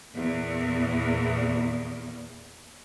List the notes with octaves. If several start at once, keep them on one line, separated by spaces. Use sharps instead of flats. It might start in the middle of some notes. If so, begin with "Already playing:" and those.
E2 A#2